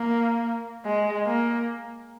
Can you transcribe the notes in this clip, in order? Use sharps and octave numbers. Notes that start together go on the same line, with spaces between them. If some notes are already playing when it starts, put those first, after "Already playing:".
Already playing: A#3
G#3
A#3